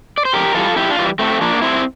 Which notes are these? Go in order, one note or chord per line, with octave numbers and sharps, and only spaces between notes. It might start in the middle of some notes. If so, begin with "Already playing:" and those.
D5
C5
F2 G4 A#4
E3 G3 F4 A4
F2 E4 G4
D4 F4
E3 G3
A2 A3 C4
F3 A#3 D4
A2 C4 E4